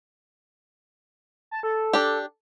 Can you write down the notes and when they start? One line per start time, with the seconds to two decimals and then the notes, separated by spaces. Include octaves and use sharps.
1.51 A5
1.63 A4
1.93 D4 G4